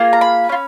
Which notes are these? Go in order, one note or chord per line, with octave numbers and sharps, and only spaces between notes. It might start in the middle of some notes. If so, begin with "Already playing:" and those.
Already playing: A#3 F4 G#4
A#5
B5
C#4 F4